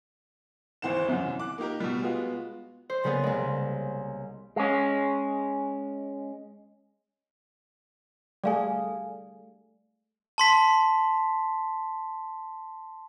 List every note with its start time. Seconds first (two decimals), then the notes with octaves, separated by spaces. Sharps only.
0.82 G#1 D#2 E3 C5 F#5 E7
1.08 C2 F#2 C3 E3
1.39 D6 F#6
1.58 A#3 D#4 G4 A#4
1.80 B2 G3
2.02 G#3 B3 F4 F#4
2.90 C5
3.04 C#3 G3 A#3 B3 G#4
3.23 C2 G#3
4.56 G#3 C#4
8.44 G3 A3 G#4 D5 F5 G#5
10.38 A5 C6 B6